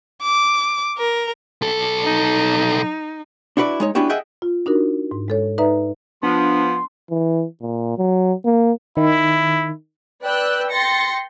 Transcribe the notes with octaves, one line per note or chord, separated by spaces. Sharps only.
D6
A#4
B1 A4
D#4
D4 E4 F#4 B4 D5
G#3 D#4 C#5
B3 C#4 D4 E4 F#4 G4
G#4 D#5 E5 F#5 G5
F4
D4 D#4 F#4 A#4
G#2
G#3 A4 C#5
D#4 B4 D5 E5 A#5
F3 B3 D4 C6
E3
A#2
F#3
A#3
D#3 E4
B4 D5 G5 E6 F#6
G5 C6 A6 A#6 C#7